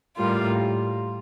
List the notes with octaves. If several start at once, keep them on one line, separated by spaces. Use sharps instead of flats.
A2 G3 A#3 F4